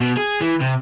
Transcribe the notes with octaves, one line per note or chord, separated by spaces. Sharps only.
B2
G#4
E3
C3